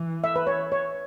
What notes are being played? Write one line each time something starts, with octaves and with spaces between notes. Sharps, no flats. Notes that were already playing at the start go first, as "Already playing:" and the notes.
Already playing: E3
E5
B4
C#5
C#5